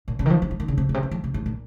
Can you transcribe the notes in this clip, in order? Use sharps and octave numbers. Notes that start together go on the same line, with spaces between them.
A#2
C#3
D#3
F3
D#3
F3
D#3
C#3
C3
A#2
C3
D#3
F3
C3
G#2
A#2